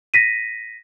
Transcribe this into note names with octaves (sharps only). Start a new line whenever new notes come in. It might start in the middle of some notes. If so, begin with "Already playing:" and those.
A#6 B6 D#7